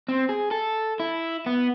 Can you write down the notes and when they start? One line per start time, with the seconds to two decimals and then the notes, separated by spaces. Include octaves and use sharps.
0.08 C4
0.29 G#4
0.51 A4
1.00 E4
1.46 B3